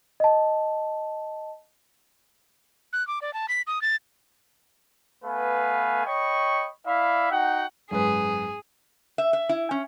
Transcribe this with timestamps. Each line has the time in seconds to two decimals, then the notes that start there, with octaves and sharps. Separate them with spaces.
0.20 D#5 A5
2.93 F#6
3.07 D6
3.22 D5
3.34 A5
3.49 B6
3.67 D#6
3.82 A6
5.24 A3 B3 B4 F5 G#5
6.06 C#5 D#5 G5 B5 C#6
6.85 E4 D5 E5 F5 B5
7.31 D#4 F#4 F#5 G5
7.91 F#1 G#2 G#4 B4
9.18 E5
9.33 E5
9.49 E4
9.71 C#4